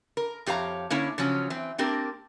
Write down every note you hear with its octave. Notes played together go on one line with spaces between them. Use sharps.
A#4
F2 G4 C#5 F5 A#5
D3 A#3 C#4 E4 C#5
C#3 F3 F#3 C#4
E3 C4
A#3 C4 D4 G4 A#4